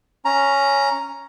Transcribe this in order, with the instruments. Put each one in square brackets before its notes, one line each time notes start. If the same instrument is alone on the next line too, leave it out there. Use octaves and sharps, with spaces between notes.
[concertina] C#4 A#5